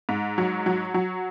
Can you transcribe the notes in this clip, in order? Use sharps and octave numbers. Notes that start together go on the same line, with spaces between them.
G#2
F#3
F#3
F#3